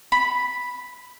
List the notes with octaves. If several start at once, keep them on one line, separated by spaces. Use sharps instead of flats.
B5